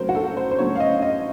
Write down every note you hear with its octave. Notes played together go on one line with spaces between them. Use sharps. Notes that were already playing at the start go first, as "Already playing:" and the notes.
Already playing: C#3 F#3 A3 C#4 A#4 C5
F#4
A4
C5
C5
C#3 F#3 A3 C#4 C#5
F5
D#5
D#5